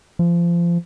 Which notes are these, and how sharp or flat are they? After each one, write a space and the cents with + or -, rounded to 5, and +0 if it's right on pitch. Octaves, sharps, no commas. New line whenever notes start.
F3 -25